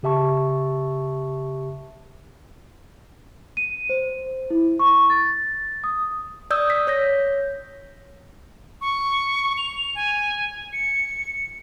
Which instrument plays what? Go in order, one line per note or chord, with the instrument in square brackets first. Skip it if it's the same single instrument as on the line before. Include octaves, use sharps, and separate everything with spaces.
[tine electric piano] C#3 G4 E5 A5 C#6
[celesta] D#7
C5
E4
C#6
A6
D#6
[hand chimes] D5 D#6 E6 G6
B6
C#5 G6 A#6
[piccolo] C#6
F7
G#5
C#7